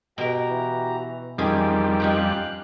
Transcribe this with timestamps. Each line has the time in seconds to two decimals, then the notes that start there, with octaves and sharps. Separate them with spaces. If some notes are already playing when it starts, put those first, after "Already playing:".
0.18 B2 F#4 G4 A#4 A#5
0.50 E3
1.38 F2 D#3 E3 G3 C#4 G#4
2.00 C#4 D#4 G4 F5 G5 F#6